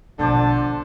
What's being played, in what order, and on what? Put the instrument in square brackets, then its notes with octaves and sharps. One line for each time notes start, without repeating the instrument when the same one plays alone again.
[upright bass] A#1 B2 [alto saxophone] D3 [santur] D4 C5 D5 [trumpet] A5